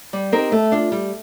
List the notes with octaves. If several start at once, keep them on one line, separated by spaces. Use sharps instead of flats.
G3
C4 D#4 G4 A#4
A3
D4 F4
G3